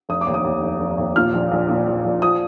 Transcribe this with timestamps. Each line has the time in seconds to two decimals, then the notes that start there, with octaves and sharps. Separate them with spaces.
0.09 F1 D#6
0.21 D6
0.27 D#2
0.34 D#6
0.44 D#2
0.63 F1
0.80 F1
0.98 D#2
1.16 A#2 F6
1.34 A#1
1.52 A#1
1.68 A#2
1.87 A#1
2.05 A#1
2.22 F3 D#6